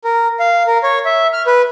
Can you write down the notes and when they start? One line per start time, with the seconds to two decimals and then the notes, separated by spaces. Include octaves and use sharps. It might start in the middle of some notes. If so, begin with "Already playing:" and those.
0.04 A#4
0.39 F5
0.67 A#4
0.83 C#5
1.05 E5
1.33 F6
1.47 B4